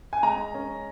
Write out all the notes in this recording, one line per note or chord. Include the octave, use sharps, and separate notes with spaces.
G#5
G#3 A#5
C#4